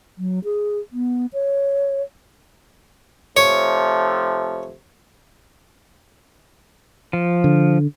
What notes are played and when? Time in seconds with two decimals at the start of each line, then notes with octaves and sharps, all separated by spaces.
0.18 F#3
0.44 G#4
0.93 B3
1.33 C#5
3.37 C3 F3 A3 C#5
7.13 F3
7.44 D3